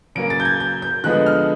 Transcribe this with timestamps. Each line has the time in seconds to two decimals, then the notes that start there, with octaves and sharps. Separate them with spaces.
0.15 C#3 F#3 A#3 D7
0.30 A6
0.40 G6
0.45 G#6
0.60 G6
0.82 G6
1.04 D3 F3 G#3 B3 F#6
1.26 F6